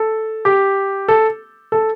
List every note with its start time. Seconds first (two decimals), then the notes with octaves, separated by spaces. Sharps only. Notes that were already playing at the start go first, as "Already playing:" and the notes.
Already playing: A4
0.45 G4
1.08 A4
1.72 A4